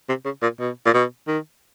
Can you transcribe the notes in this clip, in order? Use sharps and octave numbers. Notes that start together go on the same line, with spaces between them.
C3
C#3
A#2
B2
A#2
B2
D#3